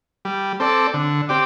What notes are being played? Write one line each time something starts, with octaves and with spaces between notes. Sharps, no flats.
G3
C4 A4 D5
D3
C4 G4 D5